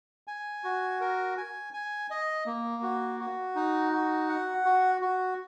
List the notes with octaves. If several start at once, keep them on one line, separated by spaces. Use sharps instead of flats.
G#5
F#4
A#4
G#5
G#5
D#5
A#3
F#4
F#4
D#4
F#4
F#5
F#4
F#4